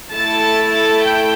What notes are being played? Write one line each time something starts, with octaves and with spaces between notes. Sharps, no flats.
A3 E4 A4 A5 A6
G5 G6